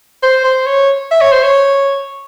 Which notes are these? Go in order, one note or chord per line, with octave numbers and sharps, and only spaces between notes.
C5
C5
C#5
E5
C#5
C5
C#5